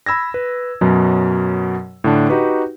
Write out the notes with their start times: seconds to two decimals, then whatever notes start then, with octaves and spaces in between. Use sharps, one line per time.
0.06 B5 E6 G#6 A#6
0.34 B4
0.81 F#2 B2 F#3
2.04 A2 D3 D4
2.29 D#4 F#4 G4 B4